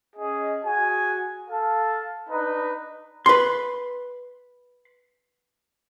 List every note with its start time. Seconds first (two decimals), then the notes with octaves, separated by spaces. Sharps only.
0.16 C#4 G#4 D#5
0.63 F#4 G#4 G#5
1.49 A4 F5 A5
2.29 D4 D#4 B4
3.26 B4 C6